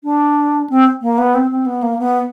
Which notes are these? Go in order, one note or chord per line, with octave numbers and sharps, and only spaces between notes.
D4
C4
A#3
B3
C4
C4
B3
A#3
B3